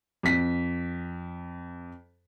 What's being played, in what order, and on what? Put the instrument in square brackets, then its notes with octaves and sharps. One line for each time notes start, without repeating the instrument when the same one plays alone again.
[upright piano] F2 B6